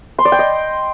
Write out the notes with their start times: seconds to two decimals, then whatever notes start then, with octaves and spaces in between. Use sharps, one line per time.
0.19 C6
0.25 D5
0.32 G5
0.39 D#5